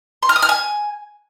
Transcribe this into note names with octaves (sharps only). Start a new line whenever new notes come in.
C6
F6
D#6
F6
G#5